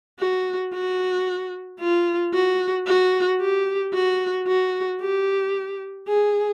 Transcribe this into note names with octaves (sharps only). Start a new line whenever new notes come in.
F#4
F#4
F4
F#4
F#4
G4
F#4
F#4
G4
G#4